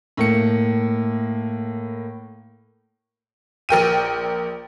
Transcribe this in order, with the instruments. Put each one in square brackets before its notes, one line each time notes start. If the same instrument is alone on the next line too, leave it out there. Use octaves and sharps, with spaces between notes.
[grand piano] A2 A#3 C#7
[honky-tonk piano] A#1 A#4 G5 D#7